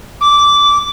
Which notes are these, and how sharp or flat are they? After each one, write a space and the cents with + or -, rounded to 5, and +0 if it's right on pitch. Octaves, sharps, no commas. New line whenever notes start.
D6 -15